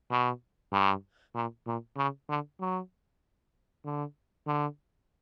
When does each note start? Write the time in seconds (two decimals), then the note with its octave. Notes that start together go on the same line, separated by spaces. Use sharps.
0.11 B2
0.72 G2
1.35 A#2
1.67 A#2
1.97 C#3
2.29 D3
2.61 F#3
3.85 D3
4.47 D3